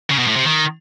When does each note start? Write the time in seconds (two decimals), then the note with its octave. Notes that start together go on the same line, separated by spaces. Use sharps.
0.10 C#3
0.19 B2
0.28 A2
0.36 C3
0.45 D#3